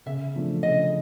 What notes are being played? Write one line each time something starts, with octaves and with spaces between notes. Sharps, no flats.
C#3 E5
F3 A3 D4
C#3 D#5